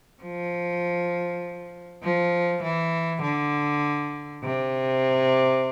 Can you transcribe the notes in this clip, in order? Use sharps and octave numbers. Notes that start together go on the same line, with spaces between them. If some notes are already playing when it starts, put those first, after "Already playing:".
F3
F3
E3
D3
C3